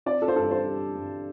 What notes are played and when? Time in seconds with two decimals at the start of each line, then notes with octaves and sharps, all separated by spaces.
0.06 C4 D5
0.22 A4
0.28 C5
0.36 G2 A4
0.51 C5
0.66 G3
0.95 G2